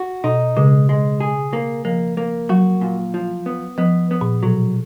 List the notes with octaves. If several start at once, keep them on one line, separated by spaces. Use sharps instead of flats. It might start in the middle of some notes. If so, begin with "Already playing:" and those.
Already playing: F#4
B2 D#4
C#3 G#3
G#3
G#4
A#3
F3 A#3
A#3
F#3 F#4
A#2
F3
B3
F3 B3
B3
A#2
B2 F#3